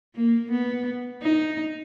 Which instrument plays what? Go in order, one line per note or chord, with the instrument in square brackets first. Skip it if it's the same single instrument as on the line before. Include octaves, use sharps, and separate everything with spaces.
[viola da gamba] A#3
B3
D#4